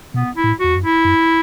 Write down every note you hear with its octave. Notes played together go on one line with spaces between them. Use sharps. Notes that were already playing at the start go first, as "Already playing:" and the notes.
B2 B3
E4
A2
E2 F#4
F#2
E4
F#2